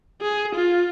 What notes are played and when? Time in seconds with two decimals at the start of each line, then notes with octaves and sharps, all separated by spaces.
0.22 G#4
0.55 F4